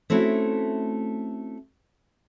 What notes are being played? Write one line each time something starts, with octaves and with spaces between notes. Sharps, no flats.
A3 C4 C#4 E4 F#4